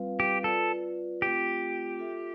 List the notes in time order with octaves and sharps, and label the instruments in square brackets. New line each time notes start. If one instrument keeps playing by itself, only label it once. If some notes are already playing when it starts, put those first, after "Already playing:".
Already playing: [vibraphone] G3 C4 F4 B4 F5
[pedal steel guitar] G4
[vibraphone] F4 B4 D5 [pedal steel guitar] A4
[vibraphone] A3 C4 F4 [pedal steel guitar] G4
[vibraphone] F4 A4 E5